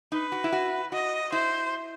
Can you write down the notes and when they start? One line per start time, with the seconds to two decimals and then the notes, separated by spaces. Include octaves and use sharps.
0.12 D#4 B4
0.32 F#4
0.44 E4
0.52 F#4
0.92 F#4 D#5
1.32 E4 C5